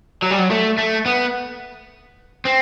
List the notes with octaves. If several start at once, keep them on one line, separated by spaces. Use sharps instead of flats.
F#3
G3
F#3
A3
A3
B3
C4